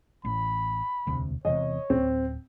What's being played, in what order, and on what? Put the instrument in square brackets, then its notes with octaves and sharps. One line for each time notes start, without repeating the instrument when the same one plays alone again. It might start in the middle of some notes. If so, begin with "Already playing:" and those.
[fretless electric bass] A1 [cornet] B5
[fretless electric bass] E1 D2 C3
[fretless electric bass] E1 E2 C3 [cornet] C#5 [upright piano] D#5
[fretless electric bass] D1 [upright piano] C4